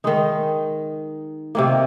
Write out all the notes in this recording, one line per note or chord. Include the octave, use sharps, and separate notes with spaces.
D#3 G#3 D#4
C3 D#3 A#3